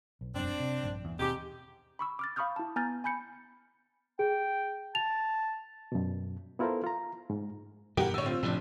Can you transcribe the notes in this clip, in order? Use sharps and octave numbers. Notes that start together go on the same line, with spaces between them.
B1
E1 F#2 B2 C4 D4
C3
A#1 G2
E2
D#2 G#2 B2 G#3 C4 G4
B5 C#6 E6
D6 F6 A6
F5 B5 C#6 D#6 F6 G6
E4 A5
B3 G#5 A#5 F6 G6 A6
G#5 B5 G6 C#7
G#4 G5
A5 F7
F#2 B2
B3 E4 F4 A4 A#4 C5
F4 A#5
G#2
G2 B2 E3 G4 A#4 F#5
A2 D3 C#5 E6
C4 F4
F1 A2 F3 D4